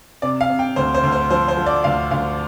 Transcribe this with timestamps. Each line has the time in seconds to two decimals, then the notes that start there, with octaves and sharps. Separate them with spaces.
0.22 C3 D5
0.41 F5
0.50 C3
0.59 G5
0.76 D2 C5
0.94 C5
1.03 D2
1.12 C5
1.30 F3 C5
1.48 C5
1.57 F3
1.66 D5
1.84 D2 F5
2.11 D2 F5